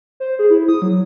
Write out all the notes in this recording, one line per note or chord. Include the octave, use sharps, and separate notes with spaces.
C5
G#4
E4
D#6
F#3